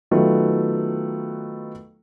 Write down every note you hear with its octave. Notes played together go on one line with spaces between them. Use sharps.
D#3 F#3 A3 B3 F4